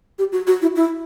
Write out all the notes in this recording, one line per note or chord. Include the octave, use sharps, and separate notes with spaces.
G4
F#4
F#4
E4
E4